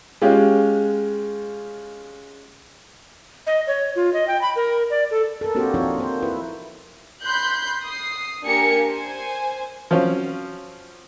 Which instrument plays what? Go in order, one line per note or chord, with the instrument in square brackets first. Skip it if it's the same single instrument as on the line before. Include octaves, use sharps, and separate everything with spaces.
[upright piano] G#3 C#4 F4 G4
[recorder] D#5
C#5
F4
D#5
G5
B5
A#4
D5
A4
[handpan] A4 A#4
A#3 C4 D4 F#4 G4 C5
F3 C4 D4 D#4 F4 C#5
A#3 D#4 C5
E4 B4
[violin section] B5 C6 F#6 G6
D#6 C7
A#3 D4 G4 A#4 G#5 C#7
C5 G#5
[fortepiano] F3 F#3 C4 C#4